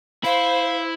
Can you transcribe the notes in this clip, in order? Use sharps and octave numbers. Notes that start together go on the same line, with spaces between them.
E4 C5 F5